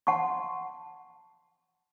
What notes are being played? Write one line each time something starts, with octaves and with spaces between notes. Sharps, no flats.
F#5 A5 C6 C#6